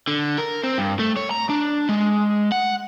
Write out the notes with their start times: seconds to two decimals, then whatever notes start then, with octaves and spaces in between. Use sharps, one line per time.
0.07 D3
0.38 A#4
0.63 C4
0.78 G2
0.99 A3
1.17 C#5
1.31 A#5
1.50 D4
1.89 G#3
2.52 F#5